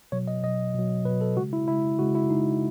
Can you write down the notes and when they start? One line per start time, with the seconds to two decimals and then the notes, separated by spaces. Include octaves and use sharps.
0.12 B2 F#3 C#5
0.28 D#5
0.43 B2 F#3 D#5
0.75 B2 F#3
1.05 B2 B4
1.11 F#3
1.21 A4
1.37 C#3 G#3 F#4
1.53 E4
1.68 C#3 G#3 E4
1.99 C#3 G#3 F#4
2.15 E4
2.30 C#3 G#3 D#4